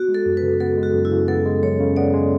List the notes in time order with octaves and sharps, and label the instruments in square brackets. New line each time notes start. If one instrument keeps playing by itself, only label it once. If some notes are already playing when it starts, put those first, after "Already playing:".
Already playing: [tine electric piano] B3 [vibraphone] F#4
[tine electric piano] G#3
[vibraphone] A4
[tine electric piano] F#2
[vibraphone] B4
[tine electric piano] C#3
[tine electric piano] B3 [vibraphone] A4
[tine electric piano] G#3
[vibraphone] F#4
[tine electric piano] F#2
[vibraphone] E4
[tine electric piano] C#3
[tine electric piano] B3 [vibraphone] A4
[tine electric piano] G#3
[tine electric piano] F#2 [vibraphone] C#5
[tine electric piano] C#3
[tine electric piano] B3 [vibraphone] D5
[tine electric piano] G#3